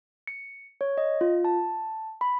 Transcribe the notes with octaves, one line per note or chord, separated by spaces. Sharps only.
C#7
C#5
D#5
F4
A5
B5